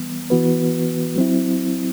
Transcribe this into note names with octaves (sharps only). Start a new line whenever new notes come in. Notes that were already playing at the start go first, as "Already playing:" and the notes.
Already playing: E3 G3 B3
E3 B3 F#4 B4
F#3 C4 E4